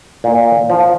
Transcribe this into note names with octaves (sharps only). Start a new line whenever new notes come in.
A#2
F3